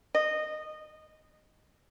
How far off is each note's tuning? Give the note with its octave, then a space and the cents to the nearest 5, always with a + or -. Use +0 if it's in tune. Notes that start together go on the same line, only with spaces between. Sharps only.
D#5 -15